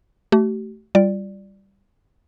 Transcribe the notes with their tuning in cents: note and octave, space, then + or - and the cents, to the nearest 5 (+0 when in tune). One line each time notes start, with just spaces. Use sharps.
A3 -5 G4 -45
G3 +0 F4 +0 D5 +0